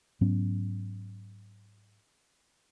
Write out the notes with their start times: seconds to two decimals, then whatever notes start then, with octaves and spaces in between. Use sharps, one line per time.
0.21 G#2 F#3 B3 C#4